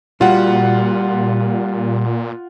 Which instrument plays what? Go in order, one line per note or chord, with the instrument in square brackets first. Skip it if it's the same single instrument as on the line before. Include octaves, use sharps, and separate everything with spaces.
[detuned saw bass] A#2 [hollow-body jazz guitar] G3 F#4 [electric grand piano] F4 F#5